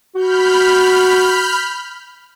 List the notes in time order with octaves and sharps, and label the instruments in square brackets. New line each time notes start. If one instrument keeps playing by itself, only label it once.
[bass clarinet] F#4 [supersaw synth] B5 F6 G6